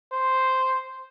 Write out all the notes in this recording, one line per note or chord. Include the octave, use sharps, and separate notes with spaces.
C5